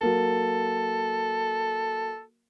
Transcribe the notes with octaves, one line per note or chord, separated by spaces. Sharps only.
F#3 A#3 A4 A#4